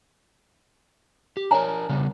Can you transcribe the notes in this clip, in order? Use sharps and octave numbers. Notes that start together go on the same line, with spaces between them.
G4
D4 A#4 C#5 G#5 A#5
C#3 G3 B3